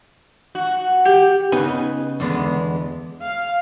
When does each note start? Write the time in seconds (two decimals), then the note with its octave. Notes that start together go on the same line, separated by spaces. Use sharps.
0.55 F#4
1.06 G4
1.52 C#3 B3 D#4 B4 G#5
2.20 E2 D3 G#3 B3
3.22 F5